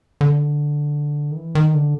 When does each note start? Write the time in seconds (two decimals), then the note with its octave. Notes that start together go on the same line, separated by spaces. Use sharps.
0.21 D3
1.31 D#3
1.36 E3
1.55 D#3
1.74 D3